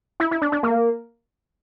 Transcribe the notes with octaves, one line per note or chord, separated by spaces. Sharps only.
E4
E4
D4
D4
A#3